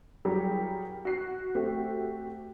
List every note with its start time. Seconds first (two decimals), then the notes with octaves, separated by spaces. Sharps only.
0.25 F#3 G3 E4 G4 G#4 A#4
1.05 F#4 C7
1.55 A3 C4 F#4 G4